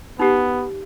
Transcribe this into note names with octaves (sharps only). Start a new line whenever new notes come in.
B3 D#4 G4